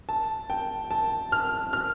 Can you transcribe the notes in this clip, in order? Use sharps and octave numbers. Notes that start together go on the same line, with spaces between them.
A5
G5
A5
F6
F6